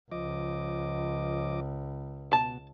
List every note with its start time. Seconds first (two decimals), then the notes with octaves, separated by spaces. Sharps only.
0.11 C#2 F3 D#5 D6
2.33 B2 A5